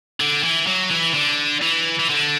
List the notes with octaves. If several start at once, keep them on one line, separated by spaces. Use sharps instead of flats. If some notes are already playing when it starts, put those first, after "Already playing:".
D3
E3
F#3
E3
D3
E3
E3
D3